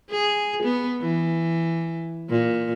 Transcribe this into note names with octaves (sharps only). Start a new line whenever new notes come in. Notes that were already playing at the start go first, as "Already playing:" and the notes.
G#4
B3
E3
A#2